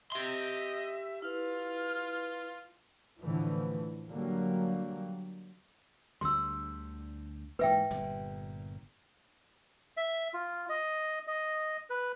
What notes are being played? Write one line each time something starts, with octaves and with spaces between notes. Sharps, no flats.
G4 D#5 E5 C6
E4 F4 B4 F6
A2 D3 E3 F3
D3 F#3 G3 A#3
D2 D3 G3 C6 E6
G#2 E3 A#3 B4 E5 G5
G1 A#2 G3
E5
F4
D#5
D#5
B4